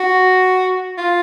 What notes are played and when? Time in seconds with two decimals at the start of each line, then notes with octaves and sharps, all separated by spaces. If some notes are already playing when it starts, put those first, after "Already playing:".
Already playing: F#4
0.98 F4